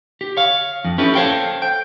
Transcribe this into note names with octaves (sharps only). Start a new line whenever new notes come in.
G4
C#5 F5
F2
C#4 E4 G4 A4 B4
A4 C5 C#5 F5 G5
G5